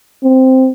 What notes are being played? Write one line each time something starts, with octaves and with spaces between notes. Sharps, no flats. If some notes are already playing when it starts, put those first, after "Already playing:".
C4